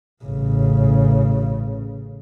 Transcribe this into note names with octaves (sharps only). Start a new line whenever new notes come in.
A1 C#3